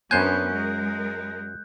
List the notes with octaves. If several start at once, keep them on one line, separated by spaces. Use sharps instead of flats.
F#2 B3 C#4 D4 C5 G#5 F#6 G6
G#3 A#4